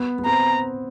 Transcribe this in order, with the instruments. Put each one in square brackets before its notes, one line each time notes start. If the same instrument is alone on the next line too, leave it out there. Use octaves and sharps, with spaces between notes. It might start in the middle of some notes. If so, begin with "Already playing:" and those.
Already playing: [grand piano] B3
B3
[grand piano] C4 [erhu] A#5